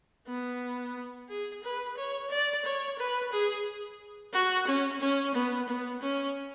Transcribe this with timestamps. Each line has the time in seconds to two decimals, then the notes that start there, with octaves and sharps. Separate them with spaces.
0.27 B3
1.29 G#4
1.63 B4
1.97 C#5
2.30 D5
2.65 C#5
2.99 B4
3.32 G#4
4.33 F#4
4.67 C#4
5.01 C#4
5.34 B3
5.68 B3
6.02 C#4